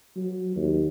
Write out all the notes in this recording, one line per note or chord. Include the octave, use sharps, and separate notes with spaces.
F#3
D#2